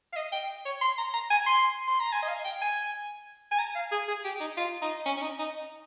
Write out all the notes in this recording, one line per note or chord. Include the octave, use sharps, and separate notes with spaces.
F5
D#5
G5
C#5
C6
A#5
A#5
G#5
C6
C6
A#5
G#5
D#5
F5
G5
G#5
G#5
A#5
F5
G#4
G#4
G4
D#4
F4
D#4
C#4
C#4
D#4
D#4